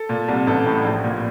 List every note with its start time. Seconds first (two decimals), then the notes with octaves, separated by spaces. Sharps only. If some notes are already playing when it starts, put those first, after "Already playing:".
Already playing: A4
0.09 A#2
0.28 C2
0.47 A1 A4
0.66 A2
0.85 A#1
1.04 A#2